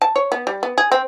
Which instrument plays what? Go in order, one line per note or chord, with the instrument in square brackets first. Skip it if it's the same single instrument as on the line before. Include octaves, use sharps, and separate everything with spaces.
[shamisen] A5
C#5
B3
G3
B3
G#4
C4